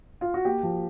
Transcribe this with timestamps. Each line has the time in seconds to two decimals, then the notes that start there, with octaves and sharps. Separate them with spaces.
0.21 F4
0.34 F#4
0.45 A#3 G4
0.63 F3